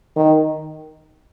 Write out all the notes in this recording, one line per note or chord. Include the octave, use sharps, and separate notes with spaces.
D#3